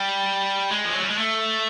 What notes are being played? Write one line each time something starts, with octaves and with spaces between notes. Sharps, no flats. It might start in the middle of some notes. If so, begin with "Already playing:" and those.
Already playing: G3
G#3
F3
F#3
G3
G#3
A3